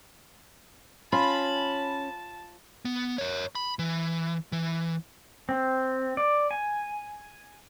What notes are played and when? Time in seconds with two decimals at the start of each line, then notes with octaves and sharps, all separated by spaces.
1.13 C#4 F4 A5 B5
2.85 B3
3.18 A#4 C#5
3.55 B5
3.79 E3
4.52 E3
5.49 C4
6.17 D5
6.51 G#5